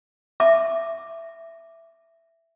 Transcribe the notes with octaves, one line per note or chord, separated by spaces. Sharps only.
E5 D6